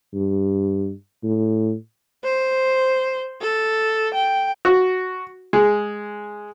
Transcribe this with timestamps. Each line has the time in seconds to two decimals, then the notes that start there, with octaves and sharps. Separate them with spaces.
0.14 G2
1.23 A2
2.24 C5
3.41 A4
4.14 G5
4.65 F#4
5.53 G#3